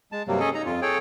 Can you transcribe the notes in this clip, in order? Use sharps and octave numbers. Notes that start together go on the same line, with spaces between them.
G#3 A5
G2 C3 F#3 G3 A#3
C#4 G#4 A4 D#5
D#4 A#5
F2 F4
G#4 A4 C#5 G5